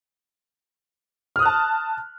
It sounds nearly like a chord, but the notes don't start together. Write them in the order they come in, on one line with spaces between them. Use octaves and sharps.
F6 D#6 F#6 A5